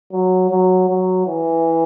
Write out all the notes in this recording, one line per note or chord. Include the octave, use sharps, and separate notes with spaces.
F#3
F#3
F#3
E3